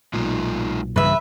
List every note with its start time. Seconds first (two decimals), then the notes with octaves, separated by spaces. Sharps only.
0.13 B1 A#2 G#3 D#4 F4
0.96 G2 C#3 E3 B4 E5